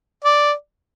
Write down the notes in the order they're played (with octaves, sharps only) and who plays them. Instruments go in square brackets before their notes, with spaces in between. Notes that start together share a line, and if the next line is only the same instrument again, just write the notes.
[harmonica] D5